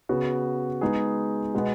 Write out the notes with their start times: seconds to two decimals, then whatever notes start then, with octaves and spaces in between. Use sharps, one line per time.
0.09 C#3 B3 F#4
0.81 G#3 B3 D#4 G#4
1.54 B2 G#3 B3